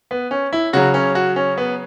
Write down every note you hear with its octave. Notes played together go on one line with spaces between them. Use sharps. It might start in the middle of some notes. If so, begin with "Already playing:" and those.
B3
C#4
E4
C#3 F#3 F#4
C#4
F#4
C#4
B3